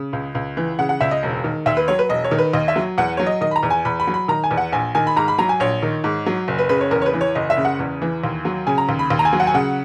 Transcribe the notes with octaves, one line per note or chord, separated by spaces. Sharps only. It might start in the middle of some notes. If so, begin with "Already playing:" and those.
Already playing: C#3
C#2
C#2
E3
C#3 F#5
F#5
C#2 E5
D#5
E1
D#3
D#2 E5
B4
F#3 C#5
B4
E1 D#5
C#5
D#3
B4
D#2 D#5
E5
F#3
E2 F#5
F#3 C#5
D#5
D#3 D#5
B5
A#5
E2
G#5
E2 B5
B5
F#3
B5
D#3 A#5
G#5
E2
F#5
A#1 G#5
D#3 G#5
B5
G#2 A#5
B5
F#3 A#5
G#5
A#1 C#5
D#3
G#2
F#3
F#1
B4
C#3 B4
C#5
E2 A#4
C#5
B4
E3
C#5
F#1 D#5
E5
C#3
F#5
E2
E3
D#2
F#3
C#3 G#5
A#5
D#2
B5
D#2
A#5
G#5
F#3
F#5
G#5
C#3 F#5